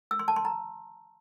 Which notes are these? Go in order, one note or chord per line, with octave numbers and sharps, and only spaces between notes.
E6
C6
A5
C6
A#5